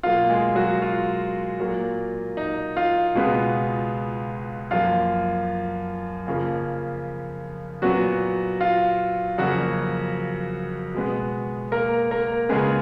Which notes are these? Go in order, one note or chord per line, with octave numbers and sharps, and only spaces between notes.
B2 F#3 A#3 F4
G#3 G#4
F#3 F#4
F4
A#2 F#3 A#3
D#4
F4
C#2 B2 G#3 B3
F#2 F3 A#3 F4
F2 C#3 F3 A#3
A#2 F#3 B3 F#4
F4
F2 C#3 F#3 A#3 F#4
B2 G#3 B3
A#3 A#4
A#3 A#4
C#2 C#3 G#3 B3 G#4